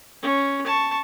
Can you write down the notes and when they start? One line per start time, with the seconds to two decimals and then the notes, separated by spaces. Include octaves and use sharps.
0.22 C#4
0.66 A5 C#6